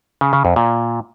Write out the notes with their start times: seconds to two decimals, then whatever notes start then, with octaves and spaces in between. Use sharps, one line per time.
0.21 C#3
0.33 C#3
0.45 F2
0.56 A#2